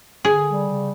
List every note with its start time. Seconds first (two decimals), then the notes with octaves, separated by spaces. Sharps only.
0.24 D3 G#4
0.46 G3
0.66 C#3